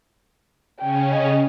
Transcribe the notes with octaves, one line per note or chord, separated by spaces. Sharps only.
C#3 C#4 G5
D#5